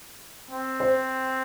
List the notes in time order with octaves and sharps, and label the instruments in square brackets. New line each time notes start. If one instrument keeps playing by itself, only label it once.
[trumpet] C4
[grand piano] C5